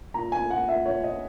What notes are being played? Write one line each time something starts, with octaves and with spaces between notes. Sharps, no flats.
A#2 A#5
A#2 G#5
A#2 F#5
A#2 E5
A#2 C#5
A#2 D#5